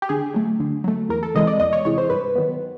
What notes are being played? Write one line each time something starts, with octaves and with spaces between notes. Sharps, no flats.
G4
D3 G#4
F#3 A3
D3
F#3 A3
E2 A#4
A4
C3 E3 G#3 D#5
D5
E2 D#5
C#5
C3 E3 G#3 C#5
C5
G2 B4
D#3 F#3 B3